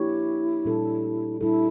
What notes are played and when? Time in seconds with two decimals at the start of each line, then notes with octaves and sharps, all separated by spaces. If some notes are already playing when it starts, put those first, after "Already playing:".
Already playing: F3 A#3 D4 E4 G4 C#5
0.65 A#2 G3 D4 A4
1.41 A#2 G3 D4 E4 A4